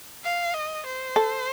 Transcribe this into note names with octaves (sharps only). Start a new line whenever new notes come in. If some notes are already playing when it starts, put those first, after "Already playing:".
F5
D#5
C5
A4